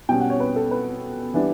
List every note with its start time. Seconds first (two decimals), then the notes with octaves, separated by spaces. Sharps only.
0.09 B2 G3 C#4 G5
0.20 F#5
0.30 C#5
0.40 B4
0.56 A4
0.71 B4
1.34 E3 G3 B3 D4